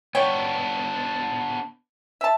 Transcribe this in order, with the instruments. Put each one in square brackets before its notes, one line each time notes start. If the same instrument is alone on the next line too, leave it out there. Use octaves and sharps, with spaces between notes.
[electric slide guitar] B3 D4 [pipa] C#5 G5
[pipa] E5 A5